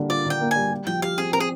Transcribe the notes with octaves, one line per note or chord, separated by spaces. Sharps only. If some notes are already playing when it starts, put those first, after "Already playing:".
Already playing: D3 G3 A#3
F4 D5
D3 G5
A#3
G3 G#5
G4
F3 G5
G4 F5
C4 G#4
C4 A#4
G#4